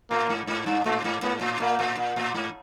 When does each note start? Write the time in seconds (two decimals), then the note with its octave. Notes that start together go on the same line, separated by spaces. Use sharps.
0.11 A2 A#3
0.29 G#2
0.47 G#2
0.66 G2
0.85 A2 A3
1.04 G#2
1.23 G#2 B3
1.41 A2
1.60 A#2 A#3
1.79 A2
1.97 A#2
2.16 A2
2.34 G#2